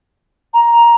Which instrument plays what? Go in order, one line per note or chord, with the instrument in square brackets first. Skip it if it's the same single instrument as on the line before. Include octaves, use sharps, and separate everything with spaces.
[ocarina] A#5